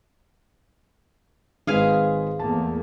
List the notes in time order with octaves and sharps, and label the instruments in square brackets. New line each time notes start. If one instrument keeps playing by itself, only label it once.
[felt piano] G#1 G#3 B4 [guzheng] G#4 F5 G#5
[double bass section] E2 A3 A#3 [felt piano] A5